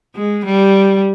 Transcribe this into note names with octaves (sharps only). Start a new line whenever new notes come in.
G#3
G3